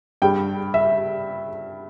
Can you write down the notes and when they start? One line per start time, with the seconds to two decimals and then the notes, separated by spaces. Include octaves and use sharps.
0.22 G2 G3 G5
0.74 E5